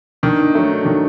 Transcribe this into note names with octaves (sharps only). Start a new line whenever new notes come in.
D#3 D4
D#4
F#3 A3 D#4
D4
D4
D#3 D#4